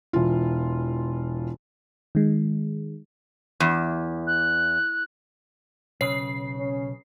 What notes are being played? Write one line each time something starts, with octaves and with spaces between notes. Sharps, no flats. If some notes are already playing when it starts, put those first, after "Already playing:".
E1 E3 F4
D#3 G#3
E2
F#6
B1 C#3 C#5 C7
C#4